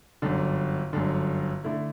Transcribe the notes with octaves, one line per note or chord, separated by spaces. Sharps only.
G1 F#2 D3
G1 F#2 D3
D3 A3 E4